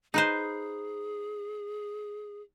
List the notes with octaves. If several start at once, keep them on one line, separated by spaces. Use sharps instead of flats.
D#4 G#4 B4 C5